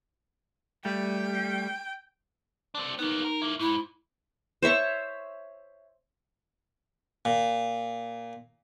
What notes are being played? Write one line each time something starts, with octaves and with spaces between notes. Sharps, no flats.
G3 A3 G5
C4 D4
A#3 B3 D#4
A#4
A#3 E4
G#2 E4
C5 C#5 E5 C#6
A#2